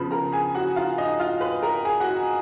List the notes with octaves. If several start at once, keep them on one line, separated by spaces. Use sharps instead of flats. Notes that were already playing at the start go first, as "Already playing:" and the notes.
Already playing: C#3 F3 B3 B4 B5
A#4 A#5
G#4 G#5
F#4 F#5
F4 F5
D#4 D#5
F4 F5
B4 B5
A#4 A#5
G#4 G#5
F#4 F#5